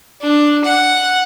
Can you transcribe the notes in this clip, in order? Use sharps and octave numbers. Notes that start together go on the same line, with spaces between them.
D4
F#5